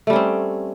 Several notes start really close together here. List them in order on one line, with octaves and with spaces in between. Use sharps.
A3 G3 C#4 C4